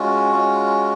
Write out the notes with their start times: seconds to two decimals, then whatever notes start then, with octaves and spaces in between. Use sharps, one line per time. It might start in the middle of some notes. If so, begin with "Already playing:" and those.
Already playing: G#3 C#4 F4 F#4
0.32 G#3 C#4 F4